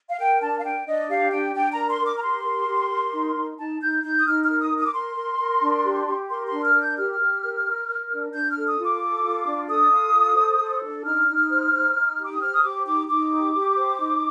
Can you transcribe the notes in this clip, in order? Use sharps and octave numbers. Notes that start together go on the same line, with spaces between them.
F5
A#4 G5
D4 A5
F5
D4 G5
D4 D#5
G4 F5
D4 G5
D4 G5
A#5
A#4
C6
A#4 D6
A#5
G4 C6
A#4
G4
A#4
D#4
D#4
D#4 A5
D#4 G6
D#4 G6
D#6
D#4 F6
F6
A#4
D#6
A#4
D#6
D6
A#4 C6
A#4
A#4
D4
G4
G4
A#4 C6
C6
D4
F6
A#4
G6
G4 F6
G4
A#4
A#4
A#4
D4
D4 G6
F6
A4
D#6
F4
D6
A4
F4
D4
A4 D#6
F4
A4
C5
A4
D4
D#4 F6
D#4
C5
D#4
D#4
G4
D6
D#6
C5 F6
D#6
G4 D6
D#4 D6
D#4 D6
G4
G4
C5
D#4